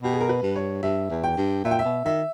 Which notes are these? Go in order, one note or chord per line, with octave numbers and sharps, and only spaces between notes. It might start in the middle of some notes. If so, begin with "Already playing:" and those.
B2 G4
G#4
A#4
B4
G2
C#5
G2 E5
E2
G5
G2
A#2 E5
G5
E5
B2
D#3 E5